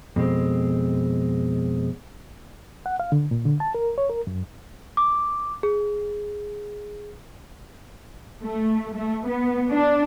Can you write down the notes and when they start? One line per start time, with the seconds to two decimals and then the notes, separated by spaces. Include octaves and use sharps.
0.16 F2 B2 G#3 C4
2.86 F#5
3.00 F5
3.12 D3
3.31 A#2
3.45 D3
3.60 A5
3.75 A#4
3.98 C#5
4.09 A#4
4.27 F#2
4.97 D6
5.63 G#4
8.43 A3
8.95 A3
9.28 B3
9.71 D4